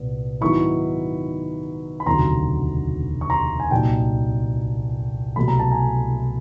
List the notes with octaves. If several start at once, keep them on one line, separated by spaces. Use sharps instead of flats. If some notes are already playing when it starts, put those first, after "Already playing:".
Already playing: C2 A#2 B3
G#2 D#3 F#3 B3 E4 B5 C#6
B5
E1 D2 C3 D#3 F#3 A#5 C6
C#6
A#5 C6
G#5
C2 A#2 F#3 A#3 D#4 G5 A5
C2 B2 F#3 A3 B5
A#5
A5
G#5 A#5